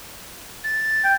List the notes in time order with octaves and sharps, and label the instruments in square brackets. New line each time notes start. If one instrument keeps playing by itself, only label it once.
[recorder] A6
[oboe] G5